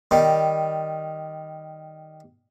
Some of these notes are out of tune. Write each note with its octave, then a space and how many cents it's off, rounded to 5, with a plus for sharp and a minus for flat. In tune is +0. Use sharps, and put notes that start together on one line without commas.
D#3 +0 G3 +0